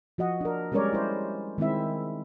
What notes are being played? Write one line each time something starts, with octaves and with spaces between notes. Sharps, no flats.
F3 F#4 D#5 F#5
D4 A#4
G3 G#3 C#4 A#4 C#5 D5
E4 C5
D#3 G#3 C4 E4 E5